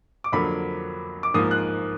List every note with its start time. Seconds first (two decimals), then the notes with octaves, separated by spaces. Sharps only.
0.24 D6
0.32 F2 D3 F#3 A#3 B5
1.23 D6
1.34 G#2 F3 A#3 D#6
1.51 F#6